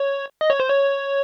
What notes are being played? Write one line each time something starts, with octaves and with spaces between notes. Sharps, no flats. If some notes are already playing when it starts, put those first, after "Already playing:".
Already playing: C#5
D#5
C#5
C5
C#5